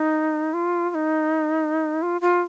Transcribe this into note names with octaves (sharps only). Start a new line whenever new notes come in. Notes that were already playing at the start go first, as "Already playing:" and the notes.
Already playing: D#4
F4
F4
D#4
F4
F4